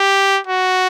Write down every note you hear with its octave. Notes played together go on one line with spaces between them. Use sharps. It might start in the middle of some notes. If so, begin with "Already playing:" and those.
Already playing: G4
F#4